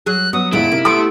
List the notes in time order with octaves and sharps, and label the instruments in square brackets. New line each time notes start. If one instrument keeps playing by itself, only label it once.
[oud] F#3 G#4 [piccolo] F#6
[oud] F#3 [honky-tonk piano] B3 [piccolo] D#6
[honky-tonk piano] F#1 G#3 [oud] D#2 A#2 B3 [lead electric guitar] E4 [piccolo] D7
[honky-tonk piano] C3 D#4 [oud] A#3
[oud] A3 B3 G4 [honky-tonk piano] A5 C6 D#6 [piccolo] D7